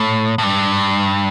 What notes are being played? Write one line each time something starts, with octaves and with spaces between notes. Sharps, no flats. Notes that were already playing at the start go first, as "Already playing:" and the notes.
Already playing: A2
A2
G2